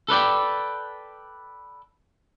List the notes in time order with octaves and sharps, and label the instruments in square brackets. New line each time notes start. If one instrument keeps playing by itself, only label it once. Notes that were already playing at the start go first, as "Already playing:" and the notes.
[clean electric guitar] A4 B4 D5 G5